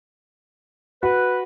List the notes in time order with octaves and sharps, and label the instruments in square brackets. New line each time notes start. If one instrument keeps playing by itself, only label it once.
[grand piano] F#4 [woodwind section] B4